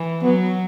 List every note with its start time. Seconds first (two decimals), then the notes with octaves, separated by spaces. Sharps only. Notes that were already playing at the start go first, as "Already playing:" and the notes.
Already playing: E3
0.23 F#3 B3